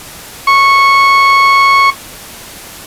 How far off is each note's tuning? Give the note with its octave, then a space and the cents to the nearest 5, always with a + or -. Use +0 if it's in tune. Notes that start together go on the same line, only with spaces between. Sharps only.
C#6 -10